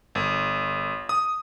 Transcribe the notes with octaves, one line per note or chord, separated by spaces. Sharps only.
G1
D#6